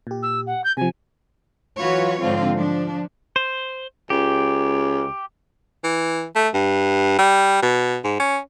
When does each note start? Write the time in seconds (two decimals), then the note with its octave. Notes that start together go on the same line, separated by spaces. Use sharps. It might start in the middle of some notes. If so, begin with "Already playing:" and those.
0.07 A#2 G4
0.23 E6
0.47 F#5
0.64 G6
0.77 C3 F3 G#5
1.77 E3 F#3 F4 F#4 B4 C#5
2.20 G#2 D3 F3 C4 F4
2.57 F3 D4
3.36 C5
4.10 C#2 G4
5.84 E3
6.36 A3
6.54 G2
7.19 G3
7.62 B2
8.04 G#2
8.20 C#4